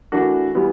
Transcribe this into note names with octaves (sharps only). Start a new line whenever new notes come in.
E3 A3 D4 F#4 A#4
E3 G3 B3